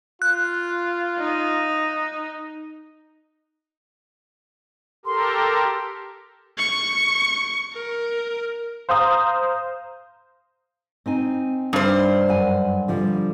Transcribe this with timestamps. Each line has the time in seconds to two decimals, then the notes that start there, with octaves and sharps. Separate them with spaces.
0.22 F4 F#6
1.18 D#4
5.06 G4 A4 A#4 C6
6.58 C#6
7.73 A#4
8.89 C5 F5 A#5 D#6
11.06 C4 D#4 G#5
11.73 G2 C5
12.28 F#2 F#5 G#5
12.88 D3 F3 G3